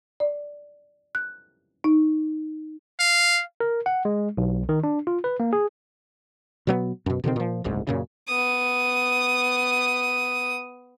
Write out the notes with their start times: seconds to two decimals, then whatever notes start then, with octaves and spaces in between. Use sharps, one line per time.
0.20 D5
1.15 F#6
1.84 D#4
2.99 F5
3.60 A#4
3.86 F#5
4.05 G#3
4.37 B1
4.69 D#3
4.84 D4
5.07 F4
5.24 B4
5.40 A#3
5.53 G#4
6.67 B2 F#3 A#3 B3
7.06 F#2 B2
7.24 B2 D3 D#3 C4
7.36 A#2 F3
7.64 F#1 C2 G#2
7.87 F#2 A#2 C#3
8.28 B3 D#6